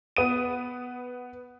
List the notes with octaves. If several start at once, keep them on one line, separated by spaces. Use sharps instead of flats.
B3 D#6 D#7